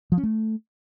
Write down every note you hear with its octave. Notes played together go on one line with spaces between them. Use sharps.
F3
C#4
A3